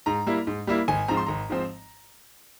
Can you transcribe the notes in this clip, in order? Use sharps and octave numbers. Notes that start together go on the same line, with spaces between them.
G#2 A#5
G3 A#3 E4
G#2
G3 A#3 E4
G#1 G#5
G#2 F3 C4 A#5
C6
G#1 A#5
G#2 F3 C4